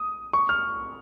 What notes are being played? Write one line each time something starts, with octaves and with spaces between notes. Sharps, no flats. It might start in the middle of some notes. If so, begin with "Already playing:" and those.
Already playing: D#6
C#6
F6